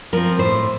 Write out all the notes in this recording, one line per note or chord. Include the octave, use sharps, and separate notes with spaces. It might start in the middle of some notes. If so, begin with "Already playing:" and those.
F3 C4 A#4
A2 C5